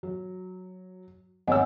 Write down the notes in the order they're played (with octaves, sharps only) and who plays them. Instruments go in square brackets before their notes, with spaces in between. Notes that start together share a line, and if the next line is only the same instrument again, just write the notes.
[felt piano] F#3
[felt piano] G#1 C#5 E6 [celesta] D#5 F#5 G#5